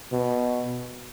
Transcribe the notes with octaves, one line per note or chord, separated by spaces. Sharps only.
B2